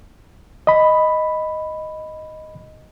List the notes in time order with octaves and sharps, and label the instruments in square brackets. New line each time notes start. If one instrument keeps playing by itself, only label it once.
[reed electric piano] D#5 B5